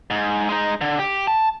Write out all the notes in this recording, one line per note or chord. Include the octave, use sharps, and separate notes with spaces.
G#2
G#3 D#4
D3
G4
A5